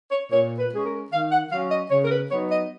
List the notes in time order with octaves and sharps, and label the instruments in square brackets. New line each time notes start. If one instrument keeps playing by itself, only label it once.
[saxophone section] C#5
A#2 C#5
B4
G#3 C#4 G#4
A#4
D#3 F5
F#5
F#3 C#4 F5
D#5
C#3 C#5
A#4
B4
F#3 B3 D#4 C#5
D#5